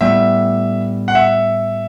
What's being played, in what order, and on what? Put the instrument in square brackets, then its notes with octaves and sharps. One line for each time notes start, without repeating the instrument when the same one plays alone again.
[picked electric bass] A2 G3 B3 [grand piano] E5
[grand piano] F#5
E5